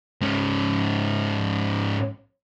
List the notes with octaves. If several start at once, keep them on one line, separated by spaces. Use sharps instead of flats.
G#2 C#4